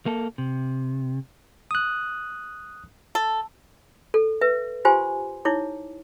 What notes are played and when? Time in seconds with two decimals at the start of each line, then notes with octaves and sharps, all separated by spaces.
0.06 A#3 A4
0.38 C3
1.71 D#6 F#6
3.15 A4
4.14 A4
4.41 B4 E5
4.85 F4 G4 C5 G#5 C6
5.45 D#4 E4 C#5 D6